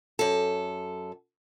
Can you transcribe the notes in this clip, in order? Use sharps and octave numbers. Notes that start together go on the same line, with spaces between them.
F#2 A4